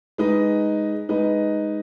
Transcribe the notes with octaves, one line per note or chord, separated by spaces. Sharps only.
G#3 D#4 B4 D#5
G#3 D#4 B4 D#5